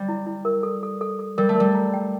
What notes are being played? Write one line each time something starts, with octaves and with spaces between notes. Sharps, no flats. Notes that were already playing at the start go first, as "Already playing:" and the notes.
Already playing: G3
E4
E4
A#4
A4
A4
A4
A4
G3 A#4
A3
G3 A#4
A#5
G5